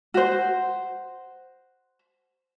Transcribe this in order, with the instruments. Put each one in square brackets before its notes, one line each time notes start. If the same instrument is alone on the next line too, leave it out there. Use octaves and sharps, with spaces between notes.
[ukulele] F#4 C5